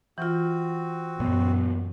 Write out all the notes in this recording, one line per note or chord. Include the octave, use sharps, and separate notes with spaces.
E3 C4 F4 F#4
F#2 A#2 B3